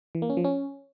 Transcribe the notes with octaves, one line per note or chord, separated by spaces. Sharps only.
E3
A#3
C#4
F3
C#4